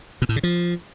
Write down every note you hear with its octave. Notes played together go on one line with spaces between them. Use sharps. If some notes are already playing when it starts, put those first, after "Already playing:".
B2
A2
C#3
F3